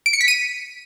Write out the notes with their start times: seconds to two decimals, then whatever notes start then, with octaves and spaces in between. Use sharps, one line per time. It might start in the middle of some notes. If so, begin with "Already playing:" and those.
0.06 D7
0.13 C#7
0.21 B6
0.28 D#7